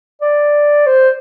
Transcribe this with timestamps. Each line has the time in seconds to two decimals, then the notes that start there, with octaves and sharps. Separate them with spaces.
0.22 D5
0.87 C5